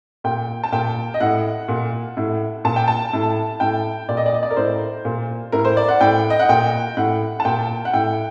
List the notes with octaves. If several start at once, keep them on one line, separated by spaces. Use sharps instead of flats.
A#2 G5
A5
A#2 G5
D#5
A2 F#5
A#2
A2
A#2 A5
G5
A5
A2
A2 G5
A#2 D5
D#5
D5
D#5
D5
A#4
A2 C5
A#2
A2 A#4
C5
D5
F#5
A2 G5
D#5
F#5
A#2 G5
A2 F#5
A5
A#2 G5
F#5
A2 G5